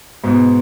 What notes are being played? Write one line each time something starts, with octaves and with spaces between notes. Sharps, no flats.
G#2 B2